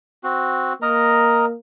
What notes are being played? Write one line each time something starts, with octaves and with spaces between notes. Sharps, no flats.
C4 F#4
A#3 A#4 D#5 A#5